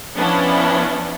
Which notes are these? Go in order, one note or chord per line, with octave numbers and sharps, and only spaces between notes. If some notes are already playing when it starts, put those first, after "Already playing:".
F3 B3 C#4 D4 E4